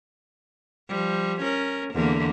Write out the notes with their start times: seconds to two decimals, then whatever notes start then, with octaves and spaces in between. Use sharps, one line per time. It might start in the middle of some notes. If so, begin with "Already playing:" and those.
0.89 F3 G3
1.41 C#4 A#4
1.94 E2 D3 A#3